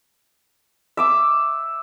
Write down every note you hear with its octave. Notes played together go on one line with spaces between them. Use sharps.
E5 D6 E6